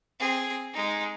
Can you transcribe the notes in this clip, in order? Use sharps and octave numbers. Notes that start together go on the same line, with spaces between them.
C4 G#4
G#3 D#4